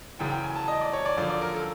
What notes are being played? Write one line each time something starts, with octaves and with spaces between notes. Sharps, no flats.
F#2 C#3 E3 G5
G5
G#5
A5
D#5
D5
C#5
D5
F#2 D3 F3 D5
D5
A#4
A4